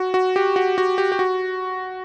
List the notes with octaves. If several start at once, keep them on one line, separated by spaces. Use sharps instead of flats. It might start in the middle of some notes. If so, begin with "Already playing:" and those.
Already playing: F#4
F#4
G4
F#4
F#4
G4
G4
F#4